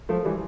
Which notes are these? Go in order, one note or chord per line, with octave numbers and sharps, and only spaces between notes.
F3 A3
E3 G3